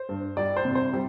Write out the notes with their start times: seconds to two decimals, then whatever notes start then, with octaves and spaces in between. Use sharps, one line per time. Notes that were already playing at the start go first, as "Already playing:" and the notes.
Already playing: C5
0.09 G2
0.37 G3 D5
0.57 C5
0.65 C3
0.75 C5
0.93 G3